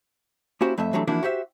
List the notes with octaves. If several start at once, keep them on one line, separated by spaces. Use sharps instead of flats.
A#3 C#4 E4 F#4 G4 C5
F2 A3 D#5 E5
E3 F#3 G3 A3 D4
E3 F3 A#3 D4 E4 F#4
F#4 G4 C5 E5